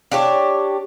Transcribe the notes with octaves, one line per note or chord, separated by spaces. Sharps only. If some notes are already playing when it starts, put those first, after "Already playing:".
D4 G4 C#5